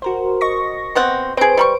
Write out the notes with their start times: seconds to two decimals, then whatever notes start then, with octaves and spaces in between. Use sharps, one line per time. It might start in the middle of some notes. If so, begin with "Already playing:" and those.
0.02 F#4 A#4 C5
0.41 D#5 C#6 A#6
0.95 B3 C4 F#5
1.37 C4 G#4 B4 C5 D7
1.57 G3 B5 C#6